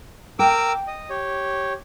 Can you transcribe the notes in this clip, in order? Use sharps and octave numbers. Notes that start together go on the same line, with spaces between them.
A#4 G5 D6 E6
D#5
G4 C#5